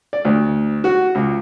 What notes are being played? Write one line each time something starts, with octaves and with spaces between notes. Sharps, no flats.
D5
D2
F#4
C#2